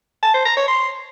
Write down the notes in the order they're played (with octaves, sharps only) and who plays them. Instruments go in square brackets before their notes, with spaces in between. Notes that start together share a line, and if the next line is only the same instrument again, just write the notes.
[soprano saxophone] A5
C5
A#5
C#5
C6